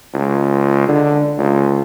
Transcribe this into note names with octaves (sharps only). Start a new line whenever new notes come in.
C#2
D3
C#2